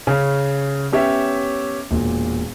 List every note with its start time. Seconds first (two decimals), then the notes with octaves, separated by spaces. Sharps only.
0.07 C#3 C#4
0.92 B3 C#4 G4 C#5 E5
1.91 E1 A#2